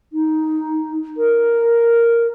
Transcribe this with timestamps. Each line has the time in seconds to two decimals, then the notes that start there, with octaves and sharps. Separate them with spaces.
0.13 D#4
1.17 A#4